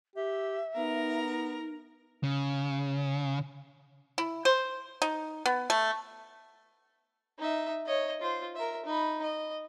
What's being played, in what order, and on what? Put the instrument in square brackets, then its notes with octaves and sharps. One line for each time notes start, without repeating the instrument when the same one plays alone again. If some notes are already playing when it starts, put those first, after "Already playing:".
[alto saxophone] G4 [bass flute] E5
[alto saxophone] B3 [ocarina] D#4 [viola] A#4 A#5
[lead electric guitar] C#3
[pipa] E4
C5
D#4
B3
A3
[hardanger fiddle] D#4 E5
C#5 D#5
F4 C5
A#4 E5
D#4 B5
D#5